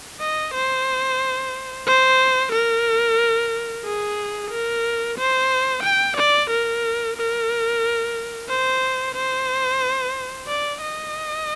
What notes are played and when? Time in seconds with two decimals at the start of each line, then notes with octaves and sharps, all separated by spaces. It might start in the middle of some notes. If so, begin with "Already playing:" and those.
0.20 D#5
0.55 C5
1.87 C5
2.52 A#4
3.85 G#4
4.51 A#4
5.18 C5
5.84 G5
6.17 D5
6.50 A#4
7.17 A#4
8.49 C5
9.15 C5
10.48 D5
10.81 D#5